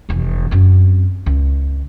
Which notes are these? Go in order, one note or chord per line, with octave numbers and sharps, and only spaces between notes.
F1 E2
F#2 C4
C#2